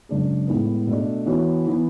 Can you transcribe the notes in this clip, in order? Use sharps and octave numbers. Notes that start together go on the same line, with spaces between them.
F#2 C#3 G#3 D4 G#4
A2 G#3 B3
B2 A3 D4
E3 B3 F#4 C#5
E3 B3